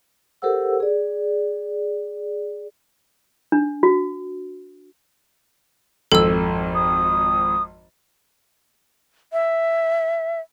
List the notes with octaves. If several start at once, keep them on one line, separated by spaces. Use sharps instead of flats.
G4 A4 A#4 C5 F#5 E6
G#4 D5
D4
F#4
G#1 F2 A4 E6
D#6
E5